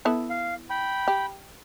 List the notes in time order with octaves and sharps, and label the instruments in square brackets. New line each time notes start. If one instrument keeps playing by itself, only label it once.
[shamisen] B3 E4 A4
[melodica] F5
G5 B5
[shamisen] G4